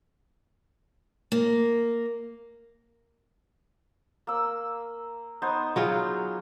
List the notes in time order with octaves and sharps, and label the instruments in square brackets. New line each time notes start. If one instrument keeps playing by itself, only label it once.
[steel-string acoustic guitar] A#3
[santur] A#3 E6
B3 D#4 C5
[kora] F#3 F4 G#4